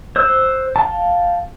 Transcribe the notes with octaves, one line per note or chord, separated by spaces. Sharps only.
C5 E6 F#6
F5 G5 A5